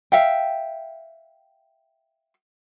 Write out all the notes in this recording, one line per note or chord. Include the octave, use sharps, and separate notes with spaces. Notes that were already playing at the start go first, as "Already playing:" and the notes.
E5 F5 G5